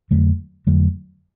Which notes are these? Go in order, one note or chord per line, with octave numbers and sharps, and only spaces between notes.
F2 D3 F#3 A3
F2 D3 F#3 A3